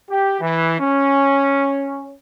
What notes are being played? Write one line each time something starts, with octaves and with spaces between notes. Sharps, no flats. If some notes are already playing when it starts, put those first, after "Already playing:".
G4
E3
C#4